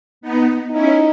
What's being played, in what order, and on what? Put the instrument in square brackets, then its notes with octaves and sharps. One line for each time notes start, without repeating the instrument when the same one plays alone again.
[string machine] B3 D#4
[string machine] C#4 E4 [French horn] D#4